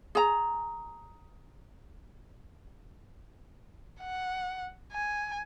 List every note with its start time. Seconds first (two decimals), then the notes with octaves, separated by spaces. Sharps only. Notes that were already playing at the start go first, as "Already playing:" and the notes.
0.15 G#4 A#5
4.00 F#5
4.92 G#5